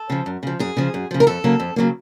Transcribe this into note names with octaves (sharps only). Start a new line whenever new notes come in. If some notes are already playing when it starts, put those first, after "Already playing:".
Already playing: A4
C#3 F3
F#2
C#3 F3
F#2 G#4
C#3 F3
F#2
C#3 F3
A#4
F2 A4
C#3 F#3 A#3
F2
C#3 F#3 A#3